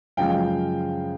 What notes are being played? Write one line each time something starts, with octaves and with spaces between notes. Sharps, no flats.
F#2 C#3 F3 G#3 F5 G5